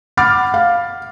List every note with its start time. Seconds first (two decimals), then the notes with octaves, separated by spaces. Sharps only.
0.17 F#5 B5 D6 F6 A6
0.54 F5